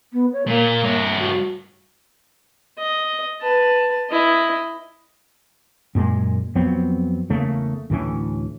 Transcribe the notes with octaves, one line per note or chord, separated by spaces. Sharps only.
B3
C#5
A#2 A#3
G2 C#5
F#4
D#5
B4 A5
E4 D#5
F#2 A#2 G#3
F2 F#3 B3 C4
E2 C#3 A3 A#3
D2 A2 E3 C#4